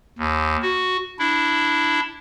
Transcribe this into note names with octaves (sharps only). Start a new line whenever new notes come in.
D#2
F#4
D4 E4